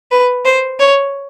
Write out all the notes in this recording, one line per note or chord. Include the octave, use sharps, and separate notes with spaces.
B4
C5
C#5